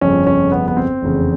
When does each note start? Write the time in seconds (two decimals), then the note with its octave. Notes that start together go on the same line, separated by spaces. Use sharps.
0.01 G1 F2 C#3 F3 C#4
0.27 C#4
0.52 B3
0.68 B3
0.77 C4
1.02 F1 E2 C#3